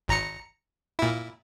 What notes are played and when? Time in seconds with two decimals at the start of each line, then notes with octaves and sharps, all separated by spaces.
0.08 G#1 A#5 C#7
0.99 A#2 E4